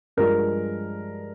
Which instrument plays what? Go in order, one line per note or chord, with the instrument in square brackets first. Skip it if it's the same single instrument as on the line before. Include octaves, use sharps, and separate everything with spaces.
[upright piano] G2 F3 G#3 A#4